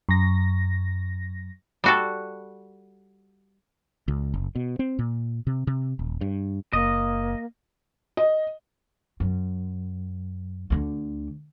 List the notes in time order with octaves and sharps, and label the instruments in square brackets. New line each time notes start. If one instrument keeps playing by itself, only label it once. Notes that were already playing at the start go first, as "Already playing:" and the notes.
[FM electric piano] F#2 A#6
[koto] G3 F#4 A4
[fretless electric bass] C#2
F#1
B2
C4
A#2
C3
C3
D#1
G2
[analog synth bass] F#1 [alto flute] A#3 [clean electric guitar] D#5
[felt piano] D#5
[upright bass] F#2
D2 D3